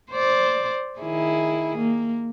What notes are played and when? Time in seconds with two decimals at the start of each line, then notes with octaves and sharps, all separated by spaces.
0.12 C5 D5
1.00 D#3 E4 G#4
1.77 A#3